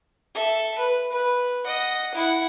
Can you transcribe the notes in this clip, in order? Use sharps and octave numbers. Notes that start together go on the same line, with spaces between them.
A4 E5
B4
B4
D#5 F#5
E4 F#5